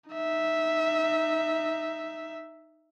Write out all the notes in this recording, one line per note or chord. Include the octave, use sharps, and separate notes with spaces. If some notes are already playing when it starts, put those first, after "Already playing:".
D#4 E5